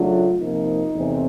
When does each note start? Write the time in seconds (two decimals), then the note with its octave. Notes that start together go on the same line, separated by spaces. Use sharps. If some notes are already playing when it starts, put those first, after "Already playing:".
Already playing: C#3 F#3 A3 D4 F4
0.38 C3 F3 A#3 D#4
0.93 E2 C3 E3 A3 C4